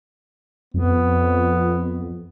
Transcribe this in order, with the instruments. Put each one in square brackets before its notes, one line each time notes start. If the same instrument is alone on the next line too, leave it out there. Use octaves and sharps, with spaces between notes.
[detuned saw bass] F2 [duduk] B3